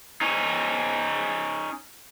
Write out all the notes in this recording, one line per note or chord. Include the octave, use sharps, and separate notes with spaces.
C#4 D#4